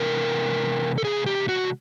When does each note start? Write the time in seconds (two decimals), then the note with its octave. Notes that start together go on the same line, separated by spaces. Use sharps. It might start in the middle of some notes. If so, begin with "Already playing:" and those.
Already playing: C3 E3 G#3 B3 D4 A#4
0.98 A4
1.05 G#4
1.26 G4
1.49 F#4